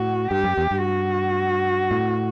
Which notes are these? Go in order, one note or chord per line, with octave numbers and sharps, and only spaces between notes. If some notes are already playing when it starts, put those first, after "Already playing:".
Already playing: A2 F#4
G2 G4
F#2
E2
G2
F#4
A2